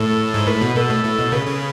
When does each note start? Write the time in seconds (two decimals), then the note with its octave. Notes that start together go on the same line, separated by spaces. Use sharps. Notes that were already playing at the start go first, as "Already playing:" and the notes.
Already playing: A2 A4
0.34 G#2
0.47 A2 B4
0.61 B2
0.76 B2 A4
0.90 A2
1.04 A2
1.19 B2
1.32 C#3 B4
1.47 C#3